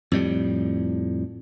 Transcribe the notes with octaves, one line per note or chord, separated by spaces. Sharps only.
F2 A2 G3